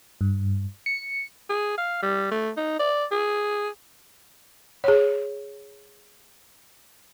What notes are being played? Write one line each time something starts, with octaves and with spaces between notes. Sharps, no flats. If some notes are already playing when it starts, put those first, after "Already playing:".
G2
C#7
G#4
F5
G3
A3
D#4
D5
G#4
G#4 C#5